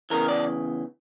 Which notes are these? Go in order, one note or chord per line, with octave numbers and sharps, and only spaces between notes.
E2 C#3 E3 A#4
D5